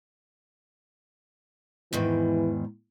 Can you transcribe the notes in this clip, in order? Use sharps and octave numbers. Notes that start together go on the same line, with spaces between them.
E2 G#2 D#3 E3